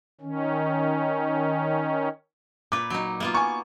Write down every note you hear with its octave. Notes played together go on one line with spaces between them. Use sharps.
D#3 C#4
A#2 B4 D6
F#3 D#4
A#3 B3 F4
G#5 C#6